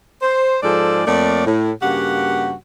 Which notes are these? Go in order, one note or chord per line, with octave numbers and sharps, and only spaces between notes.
C5
G#2 F3 G#4 A4 D5
F2 A3 A#3 C#5 D5
A2
G2 C#3 A#3 F#4 G4 F#5